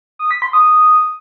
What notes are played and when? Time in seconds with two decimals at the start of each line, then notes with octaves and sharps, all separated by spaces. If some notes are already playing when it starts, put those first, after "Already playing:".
0.19 D#6
0.31 B6
0.42 C6
0.53 D#6